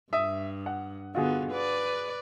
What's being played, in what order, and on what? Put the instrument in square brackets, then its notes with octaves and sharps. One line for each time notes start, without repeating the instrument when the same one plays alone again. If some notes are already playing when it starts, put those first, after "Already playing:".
[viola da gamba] G2 [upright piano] E5 D#6
[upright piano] F#5
[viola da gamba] D3 B3 [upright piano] F4 F#4 G#4
[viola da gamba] B4 D5